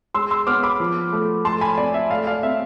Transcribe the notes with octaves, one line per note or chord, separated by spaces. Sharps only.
G#3 C6 E6
C6 E6
B3 D6 F6
B5 D6
F3
A3
A3 A5 C6
G#5 B5
C4 D5
E5
A3 D5 F5
D5 F5
C4 E5